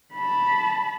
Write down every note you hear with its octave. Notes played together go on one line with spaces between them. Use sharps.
A5 B5